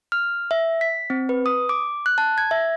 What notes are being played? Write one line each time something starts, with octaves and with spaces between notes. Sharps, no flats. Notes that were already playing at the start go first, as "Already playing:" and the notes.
F6
E5
B6
C4
B4
D#6
D6
F#6
A5
G#6
E5